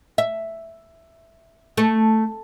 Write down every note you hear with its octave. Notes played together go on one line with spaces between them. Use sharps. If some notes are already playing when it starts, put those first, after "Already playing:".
E5
A3